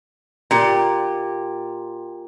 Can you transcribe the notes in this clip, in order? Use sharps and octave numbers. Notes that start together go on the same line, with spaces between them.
A#2 G4